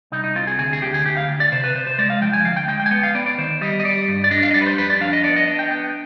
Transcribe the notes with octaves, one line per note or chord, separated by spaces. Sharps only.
C2 D#4
D#4
C4 F4
G#4
D2 G#4
G#4
D2 G4
G#4
D2 G4
F5
D2
D5
C3 C5
B4
C3 C5
C5
G#3 D5
F5
F3 G5
G#5
D2 F5
G5
G#3 G5
G5
G#5
B3 G5
F5
B3 D5
D5
D#3 C5
G3 D#5
D#5
G3 D5
G2
D5
D4 D#5
F5
D#5
G3 D5
B4
C5
F2 B4
D5
D4 F5
D#5
B3 D5
D#5
D4 D#5
G5
B3 G5